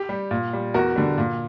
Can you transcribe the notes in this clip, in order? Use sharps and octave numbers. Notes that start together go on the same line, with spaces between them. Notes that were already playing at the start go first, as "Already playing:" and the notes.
Already playing: G4
G3
A#2
G3
E2 F#4 A#4
D3 G3
A#2